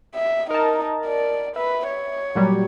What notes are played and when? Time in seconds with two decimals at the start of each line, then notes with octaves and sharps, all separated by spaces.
0.15 E5
0.51 D#4 A#4 A5
1.06 D5
1.56 B4 E5
1.87 C#5
2.35 A#2 F#3 G3